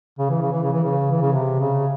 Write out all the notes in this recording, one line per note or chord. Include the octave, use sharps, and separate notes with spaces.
C#3
E3
C#3
E3
C#3
E3
C#3
E3
C#3
C3
C#3